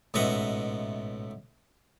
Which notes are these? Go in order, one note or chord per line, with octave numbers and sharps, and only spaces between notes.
A1 G#2 B2 D#5 E5 F#5